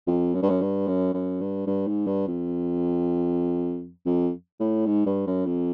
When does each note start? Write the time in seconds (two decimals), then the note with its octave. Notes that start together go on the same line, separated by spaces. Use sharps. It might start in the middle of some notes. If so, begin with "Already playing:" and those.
0.07 F2
0.34 F#2
0.42 G2
0.49 F#2
0.61 G2
0.87 F#2
1.14 F#2
1.40 G2
1.66 G2
1.87 G#2
2.06 G2
2.27 F2
4.06 F2
4.60 A2
4.86 G#2
5.06 G2
5.26 F#2
5.46 F2